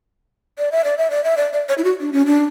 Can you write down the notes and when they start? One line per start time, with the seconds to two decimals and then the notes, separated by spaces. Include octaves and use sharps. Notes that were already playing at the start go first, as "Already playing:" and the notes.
0.58 D5
0.72 E5
0.84 D5
0.98 E5
1.11 D5
1.24 E5
1.37 D5
1.53 D5
1.69 C#5
1.78 E4
1.84 F#4
2.00 D4
2.13 C#4
2.26 D4